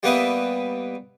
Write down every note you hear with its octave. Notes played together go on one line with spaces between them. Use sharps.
G3 A#3 B3 B4 D#5 E5